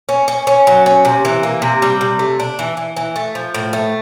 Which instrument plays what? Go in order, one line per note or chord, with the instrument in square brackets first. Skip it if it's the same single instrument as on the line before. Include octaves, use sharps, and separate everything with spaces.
[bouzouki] C#4
C#4
C#4
F#3
C#4
C3
E3
A#3
C3
G3
C3
A3
D4
E3
E3
E3
A3
F3
A2
A3